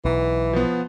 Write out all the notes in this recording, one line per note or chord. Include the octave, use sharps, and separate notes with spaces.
B1 E3
F3 B3